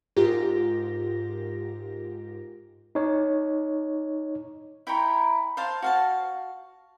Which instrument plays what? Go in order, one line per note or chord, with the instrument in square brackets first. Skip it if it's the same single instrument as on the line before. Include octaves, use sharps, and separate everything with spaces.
[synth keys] G#2 F4 G4 A#4 A#6
[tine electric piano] D#4 C#5
[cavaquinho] E4 G5 A#5 C#6
C5 F5 A5 C6
F#4 F5 A5